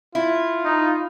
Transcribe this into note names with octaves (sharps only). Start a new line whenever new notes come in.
E4 F4
D#4